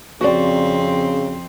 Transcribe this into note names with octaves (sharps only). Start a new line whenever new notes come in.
F2 C#3 C4 F#4 D5